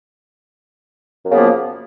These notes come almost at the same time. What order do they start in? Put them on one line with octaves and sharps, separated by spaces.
F#2 B3 C#3 A#3 F3